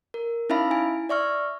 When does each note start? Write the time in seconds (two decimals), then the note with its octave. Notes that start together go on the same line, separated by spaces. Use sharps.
0.14 A#4
0.50 C#4 D#4 E4 E5 F5 B5
0.71 E4 G#5
1.09 D5 E5 C#6 F6